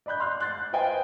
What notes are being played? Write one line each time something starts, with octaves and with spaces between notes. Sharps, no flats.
D5 D#5 B5 F#6 G6
C6 F6 F#6
F#6 G6 A6 C7
B4 C5 D#5 F5 G5 G#5